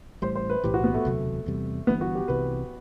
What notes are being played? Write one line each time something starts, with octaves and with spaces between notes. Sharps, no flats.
A1 A2 G3 C5
C5
B4
B1 A2 E3 G4
F#4
B3
A3
E1 D2 C3 F#3
E2 C3 G3
G1 G2 E3 B3
F#4
G4
C2 C3 E3 B4